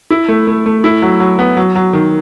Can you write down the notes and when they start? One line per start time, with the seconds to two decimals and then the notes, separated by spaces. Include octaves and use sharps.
0.11 E4
0.28 A3
0.47 A3
0.66 A3
0.84 E4
1.02 F#3
1.20 F#3
1.39 B3
1.57 F#3
1.75 F#3
1.93 D#3